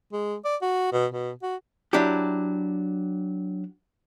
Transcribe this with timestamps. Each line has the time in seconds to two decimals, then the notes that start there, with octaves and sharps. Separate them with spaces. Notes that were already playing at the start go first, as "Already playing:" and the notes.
0.12 G#3
0.45 D5
0.62 F#4
0.92 B2
1.12 B2
1.43 F#4
1.93 F#3 D4 E4 G4